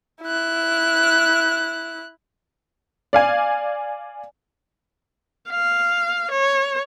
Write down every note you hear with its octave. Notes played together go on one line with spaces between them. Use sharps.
E4 F#6
D5 F5 G#5
F5
C#5